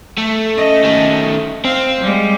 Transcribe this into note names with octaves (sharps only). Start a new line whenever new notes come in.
A3
C#4 D#5
D#3 A3
C4 F5
G3 G#3